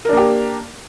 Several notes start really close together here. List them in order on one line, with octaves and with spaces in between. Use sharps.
A#4 D4 A#3 G4